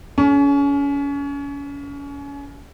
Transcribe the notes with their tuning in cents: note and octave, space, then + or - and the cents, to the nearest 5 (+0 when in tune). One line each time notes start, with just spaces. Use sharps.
C#4 +30 A4 -45